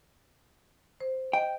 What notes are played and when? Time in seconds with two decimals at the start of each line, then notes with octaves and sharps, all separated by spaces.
1.00 C5
1.33 D#5 G5